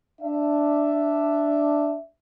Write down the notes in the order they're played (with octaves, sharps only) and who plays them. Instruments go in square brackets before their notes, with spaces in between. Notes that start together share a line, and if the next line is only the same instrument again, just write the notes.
[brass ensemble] D4 E5